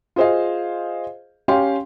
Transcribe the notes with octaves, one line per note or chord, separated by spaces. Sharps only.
F4 G#4 C5 D#5 F5
C#4 G4 F5 G5 C6